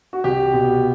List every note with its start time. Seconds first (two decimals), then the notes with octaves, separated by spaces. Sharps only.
0.13 F#4
0.24 C2 G4
0.53 B2